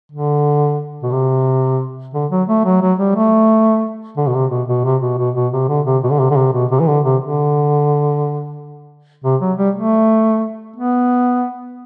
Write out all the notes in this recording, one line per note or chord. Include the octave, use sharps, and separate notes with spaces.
D3
B2
C3
D3
F#3
A3
F#3
F#3
G3
A3
D3
B2
C3
B2
B2
C3
B2
B2
B2
C3
D3
C3
B2
D3
C3
D3
C3
B2
C3
E3
D3
C3
D3
C3
F#3
G3
A3
B3